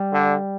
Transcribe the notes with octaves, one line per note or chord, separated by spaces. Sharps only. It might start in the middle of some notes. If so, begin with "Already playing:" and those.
Already playing: G3
D3